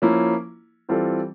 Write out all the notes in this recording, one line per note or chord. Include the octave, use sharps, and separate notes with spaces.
F3 A#3 C#4 E4
E3 G3 C4 F4 A4